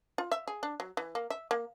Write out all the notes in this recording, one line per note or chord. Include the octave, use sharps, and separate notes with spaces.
F4
E5
G#4
D4
F#3
E3
A#3
E5
A#3